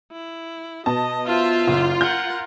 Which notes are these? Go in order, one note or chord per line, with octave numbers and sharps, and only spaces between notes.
E4
B2 D#5 A5
F4 C5 E5
F#1
A#4 F#5 F6 G6